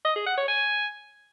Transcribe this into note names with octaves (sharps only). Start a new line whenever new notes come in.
D#5
G#4
F#5
C#5
G#5